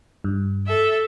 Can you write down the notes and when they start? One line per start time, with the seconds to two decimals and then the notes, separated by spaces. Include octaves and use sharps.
0.24 G2
0.67 A4 E5